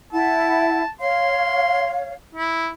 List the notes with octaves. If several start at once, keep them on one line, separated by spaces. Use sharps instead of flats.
E4 F#5 A5
C#5 F5 C6
E4